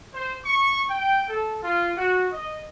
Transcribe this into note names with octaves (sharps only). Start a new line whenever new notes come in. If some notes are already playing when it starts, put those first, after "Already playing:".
C5
C#6
G5
A4
F4
F#4
D#5